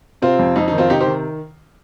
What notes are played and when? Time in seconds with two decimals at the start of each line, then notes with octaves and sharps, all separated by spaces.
0.22 C3 C4 F4
0.39 F2
0.56 F2 D#4
0.68 D#3 D#4
0.78 C4 F4
0.90 C3 D#4 G4
1.01 G4 C5
1.06 D#3